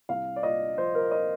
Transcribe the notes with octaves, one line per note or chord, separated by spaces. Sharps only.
C2 F5
D5
A#2 D#5
F3 C5
A#4
D#5